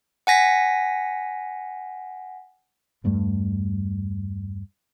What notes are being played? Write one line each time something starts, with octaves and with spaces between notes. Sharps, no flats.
F#5 G#5 A#6 B6
E2 G2 G3 A3